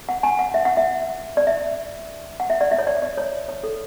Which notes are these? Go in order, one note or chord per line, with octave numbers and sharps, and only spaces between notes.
F#5
G#5
F#5
E5
F#5
E5
D5
E5
F#5
E5
D5
E5
C#5
D5
D5
C#5
C#5
A4